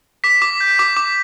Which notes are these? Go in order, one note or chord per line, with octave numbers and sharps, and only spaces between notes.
D6 B6
D6
G6
D6
D6